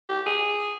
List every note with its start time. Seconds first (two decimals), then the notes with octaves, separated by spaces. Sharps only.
0.09 G4
0.26 G#4